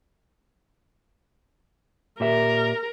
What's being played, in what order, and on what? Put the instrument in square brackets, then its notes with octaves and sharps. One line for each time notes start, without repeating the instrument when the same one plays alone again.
[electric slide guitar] A#2 G4 E5 [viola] A#4